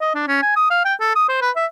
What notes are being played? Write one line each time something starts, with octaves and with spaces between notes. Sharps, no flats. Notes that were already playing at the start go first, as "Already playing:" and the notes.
D#5
D4
C#4
G#5
D#6
F5
G5
A4
D#6
C5
B4
E5